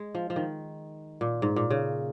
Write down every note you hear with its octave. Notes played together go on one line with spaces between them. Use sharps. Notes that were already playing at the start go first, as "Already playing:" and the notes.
Already playing: G#3
F3
F3
D#3
A#2
G#2
A#2
C#3